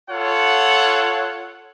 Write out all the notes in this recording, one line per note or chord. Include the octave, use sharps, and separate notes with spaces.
F4 A4 C#5 F#5